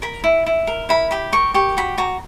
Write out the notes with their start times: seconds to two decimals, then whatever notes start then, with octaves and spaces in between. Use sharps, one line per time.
0.02 A#4 B5
0.24 E4
0.46 E4
0.67 A#4
0.89 E4 B5
1.11 G4 B5
1.32 A#4 C#6
1.54 G4 C#6
1.77 F#4 B5
1.98 F#4 A#5